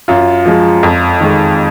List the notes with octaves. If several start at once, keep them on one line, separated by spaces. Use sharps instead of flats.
F#2 F4
F3 G#3
F2
D#3 G#3